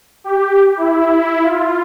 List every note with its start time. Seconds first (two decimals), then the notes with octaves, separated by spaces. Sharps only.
0.24 G4
0.77 E4
1.11 E4
1.42 F4